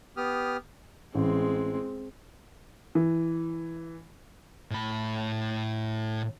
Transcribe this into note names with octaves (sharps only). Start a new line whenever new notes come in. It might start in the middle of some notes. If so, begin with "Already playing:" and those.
B3 G4 D#6 F6
A1 G#3 C4
E3
A2 B5